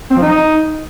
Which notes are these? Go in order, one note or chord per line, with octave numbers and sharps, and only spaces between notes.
C4
F3
D#4